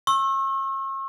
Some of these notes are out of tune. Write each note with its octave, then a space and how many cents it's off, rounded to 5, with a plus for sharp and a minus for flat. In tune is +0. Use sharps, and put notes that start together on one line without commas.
C#6 -40 E6 +0